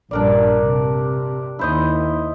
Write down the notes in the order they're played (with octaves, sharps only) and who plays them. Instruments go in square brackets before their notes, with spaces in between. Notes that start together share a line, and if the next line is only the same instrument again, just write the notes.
[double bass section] A#1 G2 [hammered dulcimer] D4 A#4 D5
[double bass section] C3
[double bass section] D#2 [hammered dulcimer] E4 C5 D#5